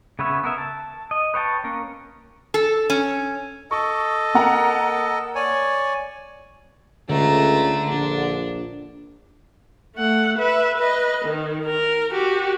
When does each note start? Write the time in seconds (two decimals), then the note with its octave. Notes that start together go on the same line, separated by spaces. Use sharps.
0.19 C#3 B3 B4 C#5 E5
0.44 B3 A#4 E5
0.58 A5
1.11 D#5
1.34 B4 C#5 G5 A5
1.64 A#3 C#4 A#4
2.54 A4
2.90 C#4
3.71 A4 D#5 C#6
4.34 A#3 F#5 A#5
5.35 C#5 D5 G#5
7.09 C#2 D3 A3 A#5
7.89 A#1 D4
9.96 A3 F#5
10.38 B4 E5
10.78 B4 D#5
11.25 D#3
11.66 A#4
12.11 F#4 G4